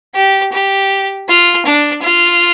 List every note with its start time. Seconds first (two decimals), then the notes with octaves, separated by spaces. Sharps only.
0.15 G4
0.52 G4
1.28 F4
1.66 D4
2.03 F4